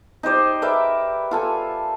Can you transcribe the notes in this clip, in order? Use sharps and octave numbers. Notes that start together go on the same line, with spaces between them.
D#4 G4 C5 D5
A#4 B4 D5 E5
F4 A4 G#5